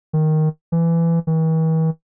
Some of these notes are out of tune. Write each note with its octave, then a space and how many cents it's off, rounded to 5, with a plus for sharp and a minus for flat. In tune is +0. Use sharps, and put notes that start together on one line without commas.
D#3 +0
E3 +20
E3 -45